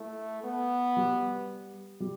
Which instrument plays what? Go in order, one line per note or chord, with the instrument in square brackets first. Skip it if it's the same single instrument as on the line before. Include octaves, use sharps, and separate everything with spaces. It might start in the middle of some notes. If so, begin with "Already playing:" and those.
Already playing: [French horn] A3 [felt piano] E4
[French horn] B3
[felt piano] G3
G3